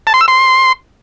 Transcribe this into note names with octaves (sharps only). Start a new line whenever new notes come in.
A5
C6
E6
C6